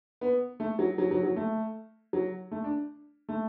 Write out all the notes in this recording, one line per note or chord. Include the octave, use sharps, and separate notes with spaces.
B3
A3
F#3
F#3
F#3
F#3
A3
F#3
A3
D4
A3